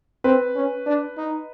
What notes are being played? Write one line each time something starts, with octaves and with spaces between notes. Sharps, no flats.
C4 B4
C#4
D4
D#4